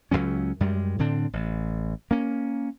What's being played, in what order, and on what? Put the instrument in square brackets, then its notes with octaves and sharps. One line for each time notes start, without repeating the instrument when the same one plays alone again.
[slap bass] C#2 G2 F#3 C#4
F#2 G3 G#3
A2 D3 C4 D4
A1
A#3 C#4